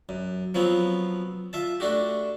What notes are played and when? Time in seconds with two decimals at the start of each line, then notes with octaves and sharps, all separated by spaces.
0.09 F#2
0.54 F3 F#3 B3 C4 F4
1.53 F4 E5 A5
1.80 A3 D4 F#4 G4